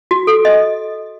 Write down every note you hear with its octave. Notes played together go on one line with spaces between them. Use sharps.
F#4
A4
D#5